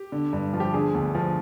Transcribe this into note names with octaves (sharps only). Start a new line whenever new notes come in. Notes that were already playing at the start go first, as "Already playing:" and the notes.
Already playing: G4
D3
G2
F3
G4
D3 G#4
D2
F3